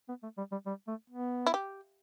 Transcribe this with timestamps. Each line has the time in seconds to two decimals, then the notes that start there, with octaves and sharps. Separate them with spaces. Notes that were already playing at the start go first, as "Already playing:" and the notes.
0.09 B3
0.23 A3
0.38 G3
0.51 G3
0.66 G3
0.88 A3
1.10 B3
1.46 E4
1.54 G4